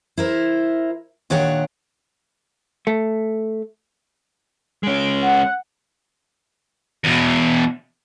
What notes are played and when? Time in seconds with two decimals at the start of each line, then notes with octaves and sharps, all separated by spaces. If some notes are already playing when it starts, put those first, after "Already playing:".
0.18 E4 A#4 C5
1.30 A#2 D#3 D4 G4 C#5 F#5
2.87 A3
4.83 G#3 C#4 D7
5.22 F#5
7.04 E2 B2